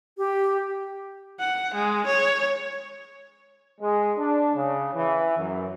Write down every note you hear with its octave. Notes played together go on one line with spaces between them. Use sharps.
G4
F#5
G#3
C#5
G#3
D4
C#3
E3
F#2